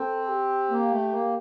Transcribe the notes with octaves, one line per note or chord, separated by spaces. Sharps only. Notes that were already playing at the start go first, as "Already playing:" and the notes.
Already playing: C4 A4
G4
A#3
A3
A#3